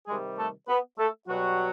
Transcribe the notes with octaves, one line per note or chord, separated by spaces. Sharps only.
C3 D#3 G3 G#3 G#4
A3 A4
B3 B4
A3 A4
B2 F#3 G3 F#4